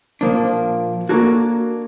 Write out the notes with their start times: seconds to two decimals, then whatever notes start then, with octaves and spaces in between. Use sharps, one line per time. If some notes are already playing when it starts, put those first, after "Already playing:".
0.21 A#2 F3 A#3 D4
1.09 A#3 D4 F#4 A4 C#5